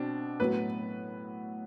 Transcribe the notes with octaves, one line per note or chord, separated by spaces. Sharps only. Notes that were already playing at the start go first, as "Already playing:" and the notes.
Already playing: B2 C4 D4
A2 F#3 B3 B4